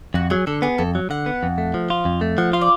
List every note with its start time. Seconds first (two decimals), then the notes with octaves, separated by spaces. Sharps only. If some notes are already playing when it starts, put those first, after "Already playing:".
0.14 F2 F#4
0.30 F#3 G#4
0.47 D3 A4
0.62 B3 G#4
0.78 F2 A4
0.95 F#3
1.10 D3 F#5
1.26 B3
1.43 F2
1.58 A3
1.74 F3
1.90 F4
2.05 F2
2.21 A3
2.38 F3 F#5
2.53 F4 F5
2.61 D5